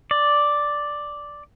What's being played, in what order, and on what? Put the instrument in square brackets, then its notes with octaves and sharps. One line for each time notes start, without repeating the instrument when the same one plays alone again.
[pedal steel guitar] D5